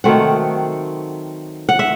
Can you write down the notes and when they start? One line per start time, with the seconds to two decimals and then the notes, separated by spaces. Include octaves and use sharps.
0.04 D#3 F#3 A3 C4 F#5
1.69 F#5
1.79 E5